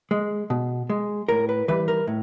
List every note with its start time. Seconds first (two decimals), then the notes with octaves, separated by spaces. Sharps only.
0.11 G#3
0.50 B2
0.90 G#3
1.29 A2 A#4
1.49 B4
1.68 E3 G3 B4
1.88 A#4
2.07 A2